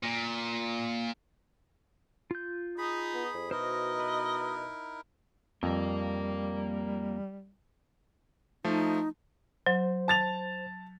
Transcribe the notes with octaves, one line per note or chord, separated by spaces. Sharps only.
A#2
F4 G6
D#4 G#4 B5
B3
F2
B2 D#4 E4 F#4 A#4 C5 D#5
B4 B5
F2 G3 A#3 A#4
F3 A3 D#4
F#3 C5
A5 A6 F7